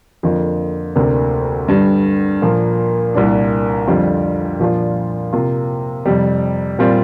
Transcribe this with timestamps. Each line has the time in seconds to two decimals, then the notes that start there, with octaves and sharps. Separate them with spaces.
0.23 F2 D3 A#3 F4
0.95 D2 C3 A#3 D4
1.68 G2 D3 G3
2.42 A#2 F3 A#3
3.14 C2 A#2 A#3 D4
3.87 F2 D3 G3 C4 F4
4.60 A#2 F3 D4 F4
5.33 C3 A#3 F4
6.05 F2 C3 G3
6.79 A#2 G3 C4 F4